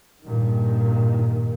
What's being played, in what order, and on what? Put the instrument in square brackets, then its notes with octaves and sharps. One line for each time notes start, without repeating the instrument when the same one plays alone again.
[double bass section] G2 A#2 D#3